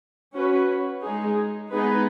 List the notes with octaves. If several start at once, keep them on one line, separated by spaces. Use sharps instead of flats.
C#4 F#4 B4
G#3 D#4 G#4
G#3 B3 D#4 G#4 B4